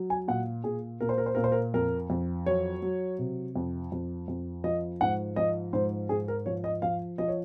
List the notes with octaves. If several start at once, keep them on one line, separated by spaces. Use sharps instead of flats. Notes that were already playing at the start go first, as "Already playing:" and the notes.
Already playing: F#3
G#5
A#2 F#5
A#2 G#4
A#2 A#4
C5
A#4
C5
A#2 A#4
C5
A#4
F2 A#4
F2
F#3 C#5
F#3
C3
F2
F2
F2
F3 D#5
G#2 F#5
F3 D#5
G#2 C5
G#2 G#4
A#4
F3 C#5
D#5
F3 F5
F3 D#5
C#5